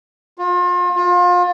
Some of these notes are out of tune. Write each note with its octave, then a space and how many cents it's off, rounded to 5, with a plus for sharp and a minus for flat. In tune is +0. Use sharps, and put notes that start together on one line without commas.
F4 +35
F4 +30